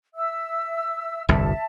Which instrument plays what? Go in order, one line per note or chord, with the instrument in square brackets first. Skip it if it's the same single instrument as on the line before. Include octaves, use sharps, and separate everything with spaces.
[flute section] E5 E6
[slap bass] G1 C2 F2 [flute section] E5 A5